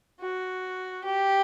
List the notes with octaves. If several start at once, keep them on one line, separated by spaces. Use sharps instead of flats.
F#4
G4